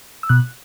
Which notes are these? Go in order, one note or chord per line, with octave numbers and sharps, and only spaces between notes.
E6
B2 F#6